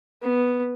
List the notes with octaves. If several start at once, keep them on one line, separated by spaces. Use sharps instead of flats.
B3